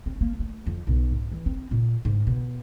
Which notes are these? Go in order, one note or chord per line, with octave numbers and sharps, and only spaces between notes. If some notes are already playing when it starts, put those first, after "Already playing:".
C4
A#3
A3
F2
B1
G#2
E3
C4
A#2
G#2
B2